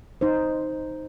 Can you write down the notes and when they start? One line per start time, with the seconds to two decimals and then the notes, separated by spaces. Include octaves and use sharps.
0.21 D#4 C5